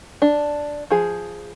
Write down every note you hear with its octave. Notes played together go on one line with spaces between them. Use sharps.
D4
F3 G#4